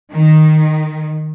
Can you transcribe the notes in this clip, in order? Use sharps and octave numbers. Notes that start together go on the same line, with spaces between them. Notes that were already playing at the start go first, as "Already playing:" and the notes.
D#3